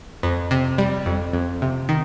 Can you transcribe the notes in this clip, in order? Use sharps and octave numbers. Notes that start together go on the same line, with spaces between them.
F2
C3
G3
F2
F2
C3
D#3